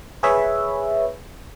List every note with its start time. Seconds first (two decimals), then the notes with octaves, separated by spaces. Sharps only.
0.23 G#4 B4 C#5 E5